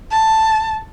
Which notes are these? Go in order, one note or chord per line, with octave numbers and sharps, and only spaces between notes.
A5